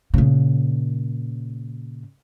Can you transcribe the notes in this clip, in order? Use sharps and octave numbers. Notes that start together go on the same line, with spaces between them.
A#2 C#3